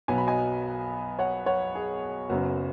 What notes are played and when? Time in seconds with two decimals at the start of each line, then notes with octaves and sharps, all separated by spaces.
0.08 B1 B2 F#3 B3 G#5
0.18 B5
0.27 D#5 G#5
1.19 C#5 F#5
1.46 C#5 F#5
1.75 G#4
2.30 F#1 F#2 F#3 B3 F#4